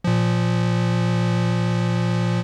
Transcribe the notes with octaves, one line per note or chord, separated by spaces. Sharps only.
A#2 F3